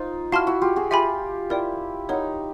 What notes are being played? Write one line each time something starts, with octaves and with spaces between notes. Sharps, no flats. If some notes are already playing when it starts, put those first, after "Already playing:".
Already playing: D#4 F4 C5
E4 F#4 F5 A5 C6 F6
E4 F#4
F4 G4
F#4 G#4
F4 G4 E5 G#5 B5
E4 A#4 D5 G5
D#4 A#4 C#5 F#5